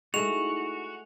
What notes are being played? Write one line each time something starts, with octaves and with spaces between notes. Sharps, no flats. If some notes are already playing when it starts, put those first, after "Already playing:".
G#3 A3 D#4 E4 F#4 F7